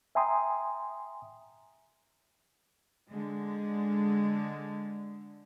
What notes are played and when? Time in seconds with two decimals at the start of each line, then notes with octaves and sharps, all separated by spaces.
0.15 E5 G5 G#5 A#5 C6 D#6
3.12 D3 G#3